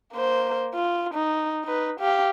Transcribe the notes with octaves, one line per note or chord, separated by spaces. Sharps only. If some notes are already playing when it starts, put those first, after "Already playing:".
A#3 C5
F4
D#4
D#4 B4
G4 F5